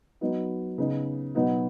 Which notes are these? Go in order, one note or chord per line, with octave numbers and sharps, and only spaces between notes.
F#3 B3 D#4
C#3 B3 D#4
B2 F#3 B3 D#4